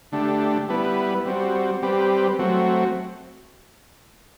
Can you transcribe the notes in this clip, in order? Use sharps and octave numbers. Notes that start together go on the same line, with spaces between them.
D3 A3 D4 G4
G3 B3 E4 B4
G3 C4 F#4
G3 C4 G4 B4
F#3 A3 C4 F#4